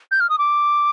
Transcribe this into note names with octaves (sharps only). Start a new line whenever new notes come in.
G6
F6
D#6
D6